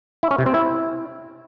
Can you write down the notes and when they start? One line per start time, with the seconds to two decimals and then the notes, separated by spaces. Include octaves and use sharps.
0.23 E4
0.31 C#4
0.38 C3
0.46 C4
0.54 E4